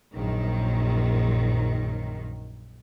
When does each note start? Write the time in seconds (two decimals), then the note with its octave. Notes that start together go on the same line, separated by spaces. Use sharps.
0.16 A#1 F#2 D#3